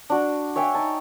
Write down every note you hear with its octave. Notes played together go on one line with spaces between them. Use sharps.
D4 F#4
C#5 E5 G5 G#5
D#4 A5